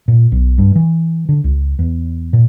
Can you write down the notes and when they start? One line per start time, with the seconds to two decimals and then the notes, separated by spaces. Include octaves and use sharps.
0.08 A#2
0.32 B1
0.58 G2
0.76 E3
1.29 D3
1.44 C#2
1.79 E2
2.33 A#2